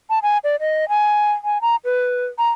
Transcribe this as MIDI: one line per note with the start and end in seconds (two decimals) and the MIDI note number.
0.10 0.19 81
0.23 0.38 80
0.44 0.56 74
0.60 0.88 75
0.89 1.32 80
1.44 1.61 80
1.62 1.76 82
1.85 2.26 71
2.38 2.49 82